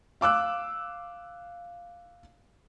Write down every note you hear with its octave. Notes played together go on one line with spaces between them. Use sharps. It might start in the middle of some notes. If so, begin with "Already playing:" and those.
F5 D6 E6 F#6